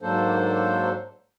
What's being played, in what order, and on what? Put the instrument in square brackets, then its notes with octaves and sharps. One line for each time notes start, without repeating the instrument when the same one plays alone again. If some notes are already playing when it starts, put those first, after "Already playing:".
[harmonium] G#2 F#3 A#3 D4 A4 C5